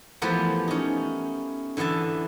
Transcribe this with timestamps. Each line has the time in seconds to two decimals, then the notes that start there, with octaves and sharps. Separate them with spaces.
0.22 E3 F3 A3 B3 G4 A#4
0.68 C#4 D#4
1.77 D3 E3 B3 E5 A5